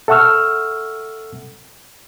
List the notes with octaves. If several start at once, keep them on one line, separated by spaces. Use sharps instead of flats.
A4 E5 F#5 C#6 E6 F6